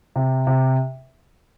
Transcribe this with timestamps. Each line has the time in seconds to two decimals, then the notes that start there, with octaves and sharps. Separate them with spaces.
0.16 C3
0.47 C3